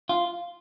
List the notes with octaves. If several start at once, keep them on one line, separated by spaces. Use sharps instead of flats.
F4